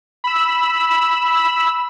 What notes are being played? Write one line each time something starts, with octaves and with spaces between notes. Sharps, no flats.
B5 E6